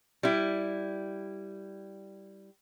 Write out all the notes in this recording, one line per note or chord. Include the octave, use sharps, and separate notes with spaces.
G3 E4